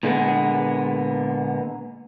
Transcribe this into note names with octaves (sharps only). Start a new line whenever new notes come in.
A#2 D3 G#3 A#3 B3